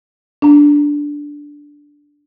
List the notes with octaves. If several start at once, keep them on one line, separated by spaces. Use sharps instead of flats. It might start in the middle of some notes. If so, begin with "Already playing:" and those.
D4 A#5